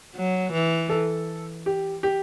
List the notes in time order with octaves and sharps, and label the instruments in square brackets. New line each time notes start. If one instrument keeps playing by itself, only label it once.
[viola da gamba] F#3
E3
[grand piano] A4
G4
G4